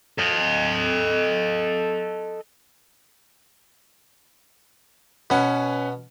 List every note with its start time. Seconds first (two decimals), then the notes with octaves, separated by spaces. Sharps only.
0.19 A4 D#5
5.30 B2 C#4 B4 F#5